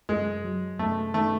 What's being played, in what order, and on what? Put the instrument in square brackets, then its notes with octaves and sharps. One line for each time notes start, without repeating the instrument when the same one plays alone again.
[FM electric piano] F#2 [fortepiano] G#3
[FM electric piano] F#3
[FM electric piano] F#2 [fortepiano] A3
[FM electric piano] D#3 [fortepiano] A3